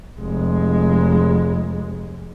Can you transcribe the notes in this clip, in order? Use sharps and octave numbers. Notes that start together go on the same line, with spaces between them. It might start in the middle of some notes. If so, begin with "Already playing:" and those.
F1 G#3